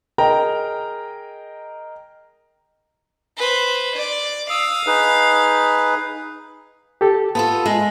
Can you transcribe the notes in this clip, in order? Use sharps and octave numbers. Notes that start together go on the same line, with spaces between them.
G#4 A#4 D#5 G5 A#5
B4 C5
D5
F5 D#6 E6
D#4 G#4 B4
G4 A4
B3 F4 A4 A5
G#3